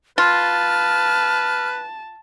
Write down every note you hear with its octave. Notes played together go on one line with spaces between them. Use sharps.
F4 B4 A5 F6